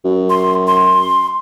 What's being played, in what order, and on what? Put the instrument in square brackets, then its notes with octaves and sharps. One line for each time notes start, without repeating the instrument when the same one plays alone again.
[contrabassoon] F#2
[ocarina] C6
C6